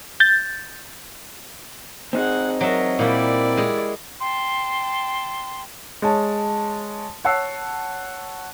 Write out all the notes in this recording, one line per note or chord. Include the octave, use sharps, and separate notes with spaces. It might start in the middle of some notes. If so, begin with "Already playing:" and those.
G6 A6
C4 D#4 G#4 F#5
F#3 A#4 D#5 E5
A#2 G3 E4 D5
G#3 G#4
G5 A5 C6
G#3 C#5 A5
C#5 F#5 A5 E6 C7